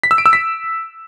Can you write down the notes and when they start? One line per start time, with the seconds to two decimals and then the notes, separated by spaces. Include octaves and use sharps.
0.04 B6
0.11 E6
0.18 D7
0.26 E6
0.33 B6